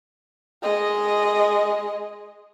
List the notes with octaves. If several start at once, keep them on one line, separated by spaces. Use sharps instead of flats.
G#3 D#5